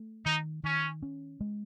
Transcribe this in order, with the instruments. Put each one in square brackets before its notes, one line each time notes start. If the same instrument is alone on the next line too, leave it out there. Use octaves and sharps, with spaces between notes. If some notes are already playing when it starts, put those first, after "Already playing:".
Already playing: [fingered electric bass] A3
[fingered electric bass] D#3 [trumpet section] D#4
[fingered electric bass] D#3 [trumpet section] C#4
[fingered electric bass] C#4
G#3